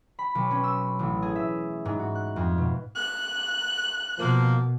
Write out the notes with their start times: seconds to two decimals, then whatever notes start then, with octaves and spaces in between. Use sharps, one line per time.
0.19 B5
0.35 B1
0.50 C#4
0.64 E6
0.99 A1
1.22 G#4
1.36 E5
1.85 G#2
1.99 F#4
2.15 F#6
2.36 F2
2.58 B2
2.95 F#6
4.19 B2 F3 A#3